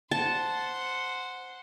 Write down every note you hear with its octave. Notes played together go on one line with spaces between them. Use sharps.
C5 F#5 A5